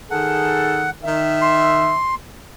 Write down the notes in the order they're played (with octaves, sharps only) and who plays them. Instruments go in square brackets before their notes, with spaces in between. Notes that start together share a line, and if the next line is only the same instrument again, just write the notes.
[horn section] D#3 G#4 A4 [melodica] F#5
[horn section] D#3 E5
[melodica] C6